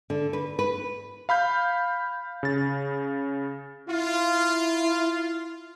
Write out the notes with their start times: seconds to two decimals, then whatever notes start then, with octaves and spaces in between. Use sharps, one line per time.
0.10 D3
0.33 B4
0.59 B4
1.29 F5 B5 F6 G6
2.43 C#3 A6
3.88 E4 F4